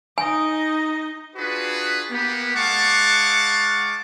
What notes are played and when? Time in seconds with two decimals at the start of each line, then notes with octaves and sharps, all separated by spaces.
0.18 D#4 D#5 G#5
1.36 D4 F4 F#4 G#4 B4
2.11 A#3 B3 G4
2.55 G#3 F5 F#5 A5 C#6 D6